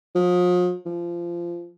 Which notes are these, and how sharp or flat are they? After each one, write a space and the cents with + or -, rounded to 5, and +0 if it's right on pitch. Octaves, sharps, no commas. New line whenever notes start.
F3 +40
F3 -20